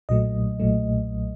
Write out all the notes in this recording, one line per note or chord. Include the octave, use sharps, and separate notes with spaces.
B1 A#2 F#3 A3 D#5
B1 A#2 F#3 A3